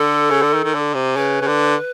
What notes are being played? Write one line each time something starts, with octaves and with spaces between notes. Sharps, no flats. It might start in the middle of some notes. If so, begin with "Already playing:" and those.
Already playing: D3 A4
C#3
D3
D#3
D#3
D3
C3
C#3 B4
C#3
D3